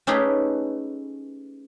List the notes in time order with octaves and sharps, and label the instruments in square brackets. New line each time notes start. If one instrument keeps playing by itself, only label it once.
[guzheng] A3 C#4 D#4 G4 G#4 B4